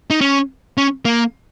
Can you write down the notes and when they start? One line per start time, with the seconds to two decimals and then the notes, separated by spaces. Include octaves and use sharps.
0.10 D#4
0.21 C#4
0.78 C#4
1.05 A#3